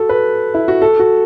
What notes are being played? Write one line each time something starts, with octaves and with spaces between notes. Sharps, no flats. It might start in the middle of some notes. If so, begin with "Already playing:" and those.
Already playing: F#4 A4
B4
E4
F#4
A4
F#4